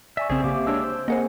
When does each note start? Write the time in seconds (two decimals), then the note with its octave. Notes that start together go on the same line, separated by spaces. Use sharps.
0.17 D5 E5 G#5 C#6
0.30 A#1 C#3 C4 G#4 C5 E5
0.44 C#3 A#3 G4 E5 D6
0.67 G#3 D4 C#5 E6
0.83 C5
1.08 A#3 C4 G#4 A#4 C5 D#5 F#5 G#5